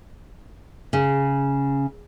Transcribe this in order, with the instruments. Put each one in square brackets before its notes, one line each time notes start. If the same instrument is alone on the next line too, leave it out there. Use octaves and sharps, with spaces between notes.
[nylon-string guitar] C#3